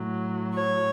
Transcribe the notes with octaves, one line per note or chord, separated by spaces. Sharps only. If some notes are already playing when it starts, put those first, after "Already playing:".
Already playing: A2 F#3
C#5